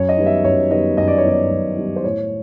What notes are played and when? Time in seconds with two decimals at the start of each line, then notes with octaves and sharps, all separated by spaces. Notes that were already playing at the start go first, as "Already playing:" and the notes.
Already playing: F#2 C#5
0.09 D#5
0.18 D#3 G3 B3
0.26 E5
0.44 F#2 C#5
0.71 D#3 G3 B3 D#5
0.97 F#2 D#5
1.08 D5
1.18 C#5
1.24 D#3 G3 B3 D5
1.50 F#2
1.77 D#3 G3 B3
1.96 C5
2.04 A2 C#5